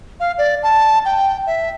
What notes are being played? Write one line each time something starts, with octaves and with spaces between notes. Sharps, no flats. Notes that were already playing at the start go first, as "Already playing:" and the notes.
F5
D5
A5
G5
E5